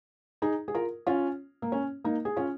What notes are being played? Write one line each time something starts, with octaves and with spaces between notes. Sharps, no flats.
D#4 G#4
G#4
F4 A#4
C#4 F4
A#3
C#4
A#3 D#4
G#4
C#4 F4